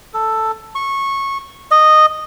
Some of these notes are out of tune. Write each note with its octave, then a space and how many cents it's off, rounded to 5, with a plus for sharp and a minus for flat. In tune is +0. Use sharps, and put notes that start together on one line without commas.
A4 +5
C#6 -15
D#5 -10